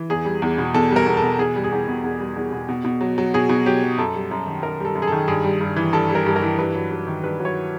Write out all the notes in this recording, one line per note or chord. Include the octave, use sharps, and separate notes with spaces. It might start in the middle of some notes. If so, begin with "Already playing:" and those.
Already playing: E3
E2 G#4
G3
E2
B2
E2 A4
G3
A#4
E2
A4
B2
E2 G#4
G3
G#4
E2 G4
B2
E2
G3
E2
B2
B2
B2
F#3
F#3
B2 G#4
B2
F#3 G4
F#3
F#2 A4
G3
F#2
D#3
F#2 A#4
G3 A4
F#2
G#4
D#3 A4
G2 G#4
G3
G2
E3
G2 A4
G3
A#4
G2
A#4
E3
G2 B4
F#3
G2
D#3
G2 B4
F#3
C#5